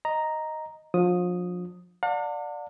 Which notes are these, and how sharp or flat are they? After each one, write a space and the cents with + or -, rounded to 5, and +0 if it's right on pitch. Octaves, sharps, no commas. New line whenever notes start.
D#5 +0 A#5 +0
F3 +35 D4 +0 D#6 +0
D5 +0 F#5 -45 A5 +45